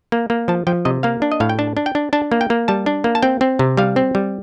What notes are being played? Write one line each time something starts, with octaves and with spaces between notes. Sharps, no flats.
A#3
A#3
F3 A5
F3 G5
C3 D#5
A#3 F5
D4
D#5
A2 F5
G5
D4 A5
D4
G5
D4
D4 A5
A#3
G5
A#3
G3 A5
D4
A#3
A5
C4 G5
C4
C3
G3 F5
C4
G3